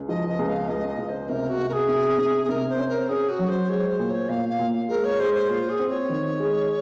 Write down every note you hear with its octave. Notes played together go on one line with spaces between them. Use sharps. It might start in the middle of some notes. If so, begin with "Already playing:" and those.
Already playing: C#2
F3 D#5
D#5
C#2
F5
C#2 D#5
D#5
C#2
C5
C3 A#4
F#4
C3
A#4
G#4
C3
C3
G#4
C3 A#4
C5
C#4
A#4
C#4 G#4
F#4
F#3
C5
G#3 C#5
C5
A#2
C#5
A#2 F5
F5
A#2
G#3 A#4
C#5
G#3 C5
C5
A#2 F4
G#4
C4
C#5
D#3
G#3